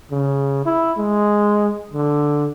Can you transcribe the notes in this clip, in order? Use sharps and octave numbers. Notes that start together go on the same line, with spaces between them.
C#3
E4
G#3
D3